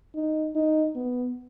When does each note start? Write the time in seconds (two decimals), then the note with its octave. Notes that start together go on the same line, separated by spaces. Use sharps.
0.16 D#4
0.56 D#4
0.96 B3